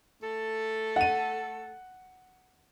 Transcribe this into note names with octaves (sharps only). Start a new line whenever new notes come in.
A3 A4
F#5 D#7